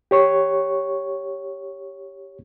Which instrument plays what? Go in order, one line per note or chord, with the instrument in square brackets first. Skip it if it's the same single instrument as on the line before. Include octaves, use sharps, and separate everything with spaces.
[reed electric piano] G4 C#5 C#6